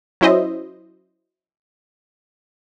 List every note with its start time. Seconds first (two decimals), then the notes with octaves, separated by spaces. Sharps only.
0.21 F#3 C#4 E4 C5 D#5 E5